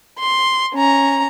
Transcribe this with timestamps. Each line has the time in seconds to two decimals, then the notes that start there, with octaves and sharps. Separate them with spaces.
0.19 C6
0.75 C#4 A#5